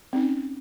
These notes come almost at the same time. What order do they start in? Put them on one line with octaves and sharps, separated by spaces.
C4 D#4 C#4